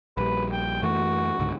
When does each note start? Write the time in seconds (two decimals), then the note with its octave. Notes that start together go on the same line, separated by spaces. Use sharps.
0.17 A#1 G3 B4
0.52 G5
0.83 F#2 E3 A3 F#4
1.40 C#2 G#2 D3